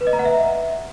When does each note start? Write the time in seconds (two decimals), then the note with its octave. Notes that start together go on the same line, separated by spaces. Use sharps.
0.01 B4
0.07 D#5
0.13 A#5
0.19 F#5
0.25 E5